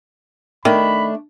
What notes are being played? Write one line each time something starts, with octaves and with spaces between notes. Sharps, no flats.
D#3 A3 D4 B5